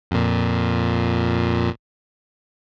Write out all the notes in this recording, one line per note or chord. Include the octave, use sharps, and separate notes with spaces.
F2 A#2